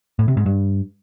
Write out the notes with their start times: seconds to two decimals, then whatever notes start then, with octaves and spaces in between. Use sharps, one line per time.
0.19 A2
0.28 C3
0.37 G#2
0.46 G2